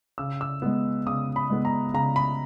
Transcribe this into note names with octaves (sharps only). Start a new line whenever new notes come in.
C#3 E6
E6
G#3 B3
C#3 D#6
B5
G#3 B3
A#5
C#3 A#5
B5